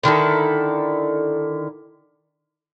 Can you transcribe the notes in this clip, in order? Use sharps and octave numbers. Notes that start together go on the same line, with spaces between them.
D3 D#3 E4 A4